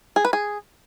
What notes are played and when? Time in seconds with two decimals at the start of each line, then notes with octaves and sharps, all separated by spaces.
0.16 G#4
0.25 B4
0.33 G#4